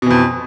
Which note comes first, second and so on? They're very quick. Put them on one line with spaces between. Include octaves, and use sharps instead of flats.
B2 E3 F2